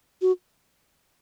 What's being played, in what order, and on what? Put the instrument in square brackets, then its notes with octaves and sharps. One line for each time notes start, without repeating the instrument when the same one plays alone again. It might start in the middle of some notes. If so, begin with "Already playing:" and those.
[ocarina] F#4